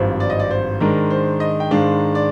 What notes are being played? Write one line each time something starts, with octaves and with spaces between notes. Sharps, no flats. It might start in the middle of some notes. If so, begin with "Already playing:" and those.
Already playing: G#1 G2 F3 C4
D5
D#5
D5
C5
G#2 D#3 G#3 D4 A#4
C5
D#5
G5
G#2 D#3 G#3 D4 F5
D5